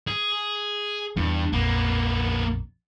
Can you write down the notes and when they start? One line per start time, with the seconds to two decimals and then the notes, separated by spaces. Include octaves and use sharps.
0.07 G#4
1.16 E2 G2 E3
1.53 A#1 F2 A#3 B3